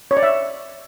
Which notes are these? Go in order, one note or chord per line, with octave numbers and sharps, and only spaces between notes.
C#5
D5
E5